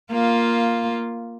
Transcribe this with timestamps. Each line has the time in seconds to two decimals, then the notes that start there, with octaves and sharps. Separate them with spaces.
0.12 A#3 F4